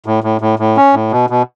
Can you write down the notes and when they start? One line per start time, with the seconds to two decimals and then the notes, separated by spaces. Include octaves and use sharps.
0.06 A2
0.24 A2
0.41 A2
0.59 A2
0.77 C#4
0.94 A2
1.11 B2
1.30 B2